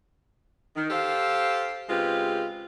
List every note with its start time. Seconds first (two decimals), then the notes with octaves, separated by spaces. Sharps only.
0.76 D#3
0.90 G4 A4 C5 F5
1.89 C#3 G#3 C4 F4 G4 B4